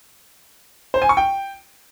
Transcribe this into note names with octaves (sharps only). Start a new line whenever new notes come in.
C5
G#5
C#6
G5